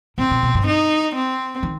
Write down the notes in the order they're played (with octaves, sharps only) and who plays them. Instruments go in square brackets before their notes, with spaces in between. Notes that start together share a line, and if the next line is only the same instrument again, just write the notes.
[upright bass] A2 [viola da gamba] C4
[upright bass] B2
B2
G2
[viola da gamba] D#4
C4
[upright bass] D#3